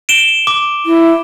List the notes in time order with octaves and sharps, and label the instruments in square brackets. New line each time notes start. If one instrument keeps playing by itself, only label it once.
[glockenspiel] D7 E7 G7
D6
[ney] E4